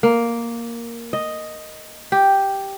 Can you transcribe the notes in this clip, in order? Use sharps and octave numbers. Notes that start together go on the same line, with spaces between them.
A#3
D#5
G4